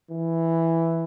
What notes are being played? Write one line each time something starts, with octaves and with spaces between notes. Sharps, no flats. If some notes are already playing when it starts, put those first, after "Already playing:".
E3